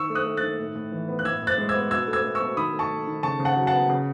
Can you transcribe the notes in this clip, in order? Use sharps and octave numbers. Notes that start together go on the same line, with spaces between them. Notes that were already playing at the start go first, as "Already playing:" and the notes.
Already playing: D#3 C#6 E6
A3
D#6 F#6
A3
F#6 A6
D#3
A2
A2
E3
B3
F#6
A2 E6 G#6
A2
F#6 A6
G#3
E6 G#6
B3
B2 E6 G#6
A3
E6 G#6
A3
C#6 E6
B2
D#3 B5 D#6
A3
A5 C#6
A3
D#3
C#3 A5 C#6
C#3
F#5 A5
F#3
F#5 A5
B3
C#3